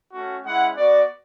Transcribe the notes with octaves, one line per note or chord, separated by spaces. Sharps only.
A3 C#4 F#4
G#3 C#4 E4 F#5
B3 F#4 D5